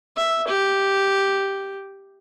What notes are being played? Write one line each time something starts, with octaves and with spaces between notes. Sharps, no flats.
E5
G4